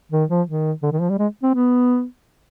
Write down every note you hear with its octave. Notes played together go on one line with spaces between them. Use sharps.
D#3
F3
D#3
D3
D#3
F3
G3
G#3
C4
B3